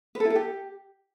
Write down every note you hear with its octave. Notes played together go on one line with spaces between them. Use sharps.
B4
A4
E4
A4
G4